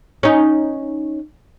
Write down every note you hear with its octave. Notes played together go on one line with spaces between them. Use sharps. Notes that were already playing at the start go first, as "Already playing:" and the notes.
C#4 D#4